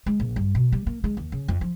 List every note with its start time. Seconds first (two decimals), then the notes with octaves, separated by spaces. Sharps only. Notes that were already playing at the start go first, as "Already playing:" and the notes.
0.06 G#3
0.20 A#1
0.36 G2
0.55 B2
0.72 G3
0.87 A#3
1.04 G#3
1.17 D#2
1.32 C#3
1.48 F2
1.61 F3